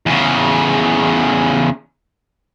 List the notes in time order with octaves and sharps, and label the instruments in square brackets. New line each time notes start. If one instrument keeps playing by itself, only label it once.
[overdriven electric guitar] E2 C#3